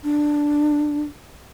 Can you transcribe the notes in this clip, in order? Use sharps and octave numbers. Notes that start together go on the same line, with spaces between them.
D4